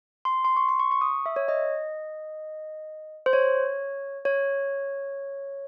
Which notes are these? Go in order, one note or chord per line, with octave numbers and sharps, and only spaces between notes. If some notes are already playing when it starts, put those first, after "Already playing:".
C6
C6
C#6
C6
C#6
C#6
D#6
E5
C#5
D#5
C5
C#5
C#5